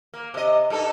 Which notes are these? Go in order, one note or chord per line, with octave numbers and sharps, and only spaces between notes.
A#3
C3 D#5
G2 D#4 A4